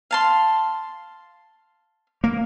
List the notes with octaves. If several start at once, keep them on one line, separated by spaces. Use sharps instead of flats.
F5 A5 C6
A#3